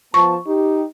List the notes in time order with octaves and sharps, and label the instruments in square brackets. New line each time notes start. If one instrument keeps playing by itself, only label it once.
[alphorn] F3 [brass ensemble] B3 A5 [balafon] C#6
[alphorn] D#4 [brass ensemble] G4